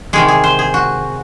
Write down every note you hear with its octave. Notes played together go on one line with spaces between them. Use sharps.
C3 D#3 G#3 G#4
G#4
C5
G#4
F#4